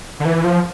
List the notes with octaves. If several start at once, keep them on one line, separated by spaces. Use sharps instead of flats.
D3
E3
F3